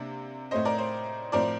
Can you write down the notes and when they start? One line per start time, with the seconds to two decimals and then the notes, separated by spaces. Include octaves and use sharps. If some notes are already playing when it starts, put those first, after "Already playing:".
Already playing: C3 A#3 D4
0.51 A2 A3 C4 C5 D#5
0.65 A#4 D5
0.78 C5
1.32 A2 F3 C4 A#4 D5